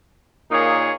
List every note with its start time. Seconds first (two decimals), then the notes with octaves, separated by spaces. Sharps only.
0.50 A#2 A#3 D#4 G#4 C#5